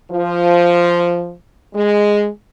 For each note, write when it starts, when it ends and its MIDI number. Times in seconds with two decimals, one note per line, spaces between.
0.11 1.33 53
1.75 2.29 56